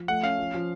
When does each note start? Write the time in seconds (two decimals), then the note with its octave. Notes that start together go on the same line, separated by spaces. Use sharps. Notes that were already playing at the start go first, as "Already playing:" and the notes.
Already playing: F3
0.08 A3 F#5
0.23 C#4 F5
0.38 F3
0.54 F3